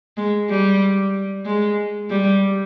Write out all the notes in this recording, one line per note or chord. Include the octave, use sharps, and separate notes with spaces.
G#3
G3
G#3
G3